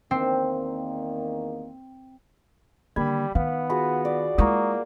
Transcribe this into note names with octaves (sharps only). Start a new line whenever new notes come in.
E2 D#3 A#3 C4
D3 D#3 G3 A#3 B5 G#6
D#3 B3 F5
F4 F#4 G#4 B5
D5
G#3 A#3 E4 A#5 C#6 D#6